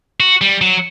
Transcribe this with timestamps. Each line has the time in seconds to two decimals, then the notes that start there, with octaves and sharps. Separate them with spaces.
0.20 F#4
0.41 G3
0.61 F#3